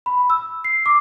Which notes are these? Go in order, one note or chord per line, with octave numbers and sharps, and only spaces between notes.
B5
E6
C7
D6